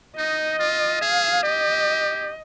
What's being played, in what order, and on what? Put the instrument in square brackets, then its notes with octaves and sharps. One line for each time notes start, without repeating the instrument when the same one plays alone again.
[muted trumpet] D#4 [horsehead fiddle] D#5
[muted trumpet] F4
[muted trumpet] G#4 [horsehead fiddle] F5
[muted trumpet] G4 [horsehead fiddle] D#5